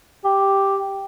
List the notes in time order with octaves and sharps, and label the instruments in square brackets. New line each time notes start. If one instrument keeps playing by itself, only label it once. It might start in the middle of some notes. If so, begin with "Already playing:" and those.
[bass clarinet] G4